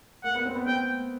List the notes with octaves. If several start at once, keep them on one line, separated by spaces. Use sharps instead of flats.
A#3 F#5
B3
C4
B3
C4 G5